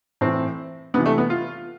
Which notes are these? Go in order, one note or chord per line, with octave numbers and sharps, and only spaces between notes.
A2 E3 C4
C3 E3 B3
A3
B3
F4